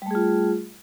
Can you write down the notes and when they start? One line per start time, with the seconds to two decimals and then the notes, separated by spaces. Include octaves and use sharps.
0.02 G3
0.06 A3
0.11 G#4
0.15 F4